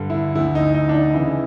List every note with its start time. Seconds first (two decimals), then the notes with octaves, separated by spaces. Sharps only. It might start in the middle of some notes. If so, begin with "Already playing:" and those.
Already playing: G2 D3
0.10 E4
0.35 D2 D3 E4
0.55 D#4
0.75 D#4
0.89 D4
0.94 D#4
1.13 E2 C#3 E3 E4